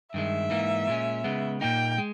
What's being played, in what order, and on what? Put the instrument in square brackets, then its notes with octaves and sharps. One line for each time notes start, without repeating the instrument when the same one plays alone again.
[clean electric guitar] G2 D#3 G#3 [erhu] E5
[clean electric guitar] G#2 E3 A#3 D#4
A#2 G#3 C#4
C#3 G#3 B3
[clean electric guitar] A#2 A#3 D#4 [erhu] G5
[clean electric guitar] G#3